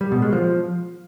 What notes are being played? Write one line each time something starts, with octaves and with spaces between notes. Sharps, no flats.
G3
B2
G#3
F3